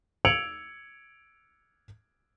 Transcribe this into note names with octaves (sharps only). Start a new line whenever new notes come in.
E6 G#6 C#7 D7 F7 F#7